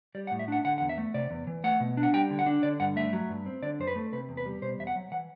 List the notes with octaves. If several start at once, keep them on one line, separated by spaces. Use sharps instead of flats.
G3 D5
F#5
A2
E5
D4 F#5
D3 F#5
E2 F#5
E5
A3
C3 D5
E2
E3
A3 F#5
B2
D4
F#5
G3 G5
D3
F#5
D4
D3 D5
G2 F#5
A3 E5
F#3
G2
C4
D3 D5
F#2 C5
B4
A3
C3 B4
E2
B4
G3
B2 C5
E2 E5
F#5
F#3
E3 F#5